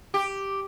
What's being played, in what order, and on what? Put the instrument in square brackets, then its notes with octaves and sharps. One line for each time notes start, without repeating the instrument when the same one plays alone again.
[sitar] G4